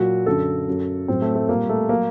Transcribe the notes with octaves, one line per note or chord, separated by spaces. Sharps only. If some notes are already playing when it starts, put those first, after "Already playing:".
Already playing: A#2 F#3 F#4
F#2 D3 F#3 A4
F#2 F#3
A2 F#3 C4
A3
A3
A#2 G3 A#3
A3
F#3 A#3